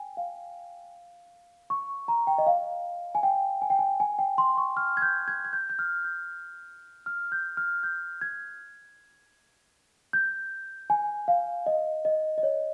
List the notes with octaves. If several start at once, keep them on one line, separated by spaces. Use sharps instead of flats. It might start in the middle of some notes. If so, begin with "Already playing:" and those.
Already playing: G5 G#5
F5
C#6
A#5
G5
D#5
F5
G#5
G5
G#5
G5
G#5
G#5
G5
C6
C#6
F6
G#6
G6
G#6
G#6
G6
G6
F6
G6
F6
G6
F6
G6
G#6
G6
G#5
F5
D#5
D#5
D#5
C#5